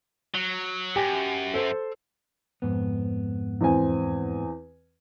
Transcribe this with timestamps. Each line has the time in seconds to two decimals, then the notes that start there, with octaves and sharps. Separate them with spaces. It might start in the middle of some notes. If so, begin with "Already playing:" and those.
0.35 F#3
0.96 F#2 G4 G5 G#5
1.54 A4 C5
2.62 F2 G#2 B3
3.61 E2 C4 G#5